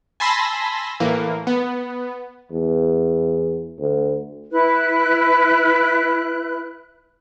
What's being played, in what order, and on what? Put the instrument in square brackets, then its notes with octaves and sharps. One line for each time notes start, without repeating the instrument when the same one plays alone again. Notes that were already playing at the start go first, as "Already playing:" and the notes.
[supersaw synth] G#5 A5 B5 C6 E6 A#6
A2 E3 A#3
B3
[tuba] E2
D2
[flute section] E4 B4 F#6